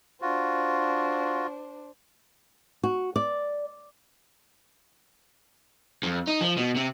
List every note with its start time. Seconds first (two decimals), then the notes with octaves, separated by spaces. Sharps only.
0.22 D4 F4 F#4 C5
2.83 F#4
3.16 D5
6.03 F2
6.28 D#4
6.41 F3
6.57 B2
6.75 C3